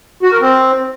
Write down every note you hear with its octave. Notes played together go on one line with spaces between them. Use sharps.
F#4
A#4
C4